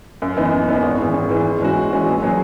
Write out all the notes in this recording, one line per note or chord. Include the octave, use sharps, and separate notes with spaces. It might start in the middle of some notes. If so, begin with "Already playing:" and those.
F#2
E3 B3 D#4
F#2
E3 B3 D#4
G#1
G#2 E3
G#1
G#2 E3
G#2
E3 G#3 C#4 F#4
G#2
E3 G#3 C#4 F#4
A#1
A#2 F#3 C#4 G#4